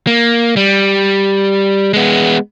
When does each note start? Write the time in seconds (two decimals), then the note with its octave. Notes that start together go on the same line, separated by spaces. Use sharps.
0.07 A#3
0.57 G3
1.94 G#3 B3